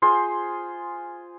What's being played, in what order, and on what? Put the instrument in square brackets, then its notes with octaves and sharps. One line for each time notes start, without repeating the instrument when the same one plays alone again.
[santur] F4 G#4 C5 C6